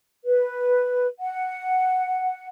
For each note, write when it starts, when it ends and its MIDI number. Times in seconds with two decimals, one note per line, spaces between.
0.24 1.07 71
1.19 2.47 78